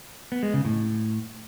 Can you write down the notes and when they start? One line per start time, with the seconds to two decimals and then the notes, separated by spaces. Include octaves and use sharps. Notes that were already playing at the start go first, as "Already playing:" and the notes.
0.32 B3
0.43 G#3
0.54 C#3
0.65 A2